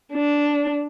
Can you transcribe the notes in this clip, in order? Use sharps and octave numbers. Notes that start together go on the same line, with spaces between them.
D4